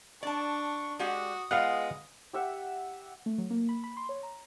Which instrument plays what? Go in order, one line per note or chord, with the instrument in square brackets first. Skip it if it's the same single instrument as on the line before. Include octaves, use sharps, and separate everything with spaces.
[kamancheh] D4 C#6 [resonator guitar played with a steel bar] D5 A5
[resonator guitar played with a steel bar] G#3 G4 D5 [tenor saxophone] F#4 [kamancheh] D#6
[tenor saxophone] G#3 [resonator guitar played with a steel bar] B3 F4 [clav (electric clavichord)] F5 F#5
[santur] G4 E5 F#5
[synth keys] A3
F#3
A#3
B5
B5
C6
C#5
A#5